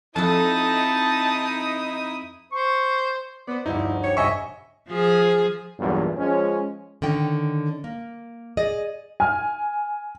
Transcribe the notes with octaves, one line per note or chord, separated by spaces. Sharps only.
F2 D#4 E4 A4 A5 D#6
C5 C#6
B3 C5 D5
F1 D2 G2 D#4 E4
G4 C#5
B1 G2 C#3 D#5 E5 G#5 C#6
F3 G#4
B1 E2 G2 A#2
F3 G#3 C#4
D3 D#3 C#4 G5
A#3
G#4 D5 D#5
G#5 F6